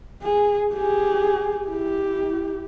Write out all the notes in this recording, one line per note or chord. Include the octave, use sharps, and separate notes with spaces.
G#4
G4 G#4
E4 G4